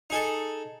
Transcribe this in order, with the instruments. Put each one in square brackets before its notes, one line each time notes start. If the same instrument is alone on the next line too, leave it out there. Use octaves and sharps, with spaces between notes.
[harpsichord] D#4 G#4 A4